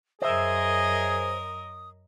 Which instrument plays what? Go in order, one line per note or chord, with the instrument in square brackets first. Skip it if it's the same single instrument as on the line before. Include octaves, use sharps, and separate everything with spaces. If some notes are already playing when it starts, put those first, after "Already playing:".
[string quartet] F#2 A#4 D#5 [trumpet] G#4 [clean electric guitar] C5 E5 [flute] D#6